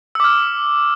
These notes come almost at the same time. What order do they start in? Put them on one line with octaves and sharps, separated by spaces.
E6 D6 F6